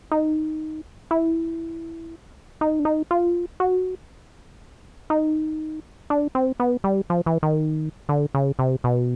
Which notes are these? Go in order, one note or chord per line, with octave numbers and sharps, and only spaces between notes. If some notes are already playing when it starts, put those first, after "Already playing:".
D#4
E4
D#4
D4
D#4
F4
F#4
D#4
D4
C4
B3
G3
F3
E3
D#3
D3
C#3
C3
B2